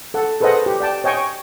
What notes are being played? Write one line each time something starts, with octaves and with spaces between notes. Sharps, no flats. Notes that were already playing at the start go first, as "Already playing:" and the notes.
A4 F#5
G#4 A4 B4 C5 D#5 F#5
G4
D5 G5 A5
C#5 D#5 G5 G#5 C#6